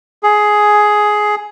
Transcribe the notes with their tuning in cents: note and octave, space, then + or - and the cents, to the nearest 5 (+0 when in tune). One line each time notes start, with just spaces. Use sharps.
G#4 +10